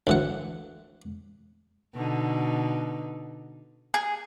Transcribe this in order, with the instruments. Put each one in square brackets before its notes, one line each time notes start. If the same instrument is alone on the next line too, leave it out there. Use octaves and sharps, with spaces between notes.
[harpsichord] D2 E3 F#5
[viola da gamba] B2 D3 D#4
[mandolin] G#4